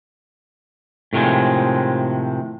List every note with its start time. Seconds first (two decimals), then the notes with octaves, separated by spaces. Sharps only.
1.13 A2 C3 D#3 F3 G#3